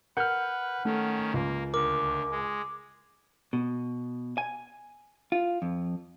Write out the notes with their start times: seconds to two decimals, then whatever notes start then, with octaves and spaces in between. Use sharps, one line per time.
0.17 A#4 B4 F#5 F6 G6
0.85 D#3 A3 C#4
1.34 C#2 A#3
1.74 D2 D3 A#4 D6
2.31 G#3
3.53 B2
4.38 G#5
5.32 F4
5.62 F2